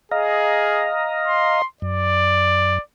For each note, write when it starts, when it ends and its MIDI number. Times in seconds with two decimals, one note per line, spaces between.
0.11 0.91 68
0.11 1.62 75
0.11 1.62 77
0.11 1.62 82
1.27 1.66 84
1.82 2.78 42
1.82 2.81 74